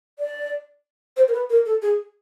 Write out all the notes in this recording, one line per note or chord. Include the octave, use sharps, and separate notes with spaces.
D5
C5
A#4
B4
A#4
A4
G#4